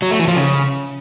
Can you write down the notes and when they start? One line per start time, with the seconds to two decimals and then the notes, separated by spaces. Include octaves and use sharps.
0.02 F#3
0.11 A3
0.19 E3
0.28 F3
0.36 C#3